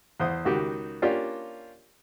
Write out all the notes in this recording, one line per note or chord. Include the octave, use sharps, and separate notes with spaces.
E2 C5 D#6
C#2 D#3 F#4 G4
A#3 C#4 D4 F4 G4